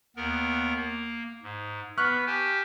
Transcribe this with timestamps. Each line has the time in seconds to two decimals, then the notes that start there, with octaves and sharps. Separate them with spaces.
0.16 D#2 B3 A#4
0.76 A#3
1.43 G#2
1.98 B3 B4 C#6 F6 F#6
2.27 G4 G#5 A5